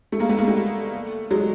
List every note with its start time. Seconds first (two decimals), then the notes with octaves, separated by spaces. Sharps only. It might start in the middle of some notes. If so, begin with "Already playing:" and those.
0.12 A3
0.19 G#3 A#3
0.29 A3 B3
0.38 G#3 A#3
0.48 G3 A3
1.31 F#3 G#3